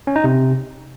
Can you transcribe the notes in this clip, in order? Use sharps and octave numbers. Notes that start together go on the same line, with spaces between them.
C#4
D#4
C3